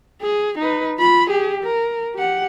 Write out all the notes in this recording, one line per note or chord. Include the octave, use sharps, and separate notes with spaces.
G#4
D#4 B4
F4 B5
G4 G#4
A#4
G4 F#5